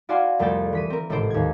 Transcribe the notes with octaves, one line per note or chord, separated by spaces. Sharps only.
E4 F#4 D5 F5 G#5 C6
C2 F2 A3 C4 G5 A6
E3 B6 D#7
C4 A#4
G#1 A2 C3 A4 C5 D7
D#2 G#6